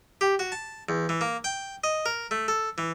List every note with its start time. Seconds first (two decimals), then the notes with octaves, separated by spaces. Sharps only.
0.21 G4
0.39 F#4
0.52 A5
0.89 E2
1.09 E3
1.21 A#3
1.44 G5
1.84 D#5
2.06 A#4
2.31 A3
2.48 A4
2.78 E3